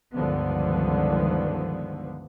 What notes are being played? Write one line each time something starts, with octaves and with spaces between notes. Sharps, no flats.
C#2 G2 D3 D#3 F3 B3